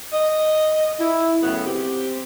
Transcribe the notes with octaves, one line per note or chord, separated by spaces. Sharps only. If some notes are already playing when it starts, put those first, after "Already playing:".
D#5
E4
F#2 A2 C#3 B3 G#4 F#5
C4 G4